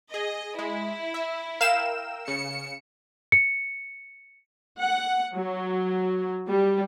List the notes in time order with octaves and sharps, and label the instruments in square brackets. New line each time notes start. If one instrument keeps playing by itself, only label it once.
[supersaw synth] G#4 [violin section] D#5
[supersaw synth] G#3 [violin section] E4
[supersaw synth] E5
[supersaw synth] A#4 G5 E6 [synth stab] F5 E7
[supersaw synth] C#3 [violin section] C#7
[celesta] C#7
[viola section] F#5
F#3
G3